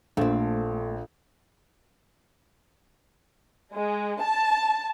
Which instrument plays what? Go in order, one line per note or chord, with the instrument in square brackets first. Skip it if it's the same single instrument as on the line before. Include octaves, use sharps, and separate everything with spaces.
[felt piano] A#1 [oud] A3 C4 [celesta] F4 A4 F5
[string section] G#3
A5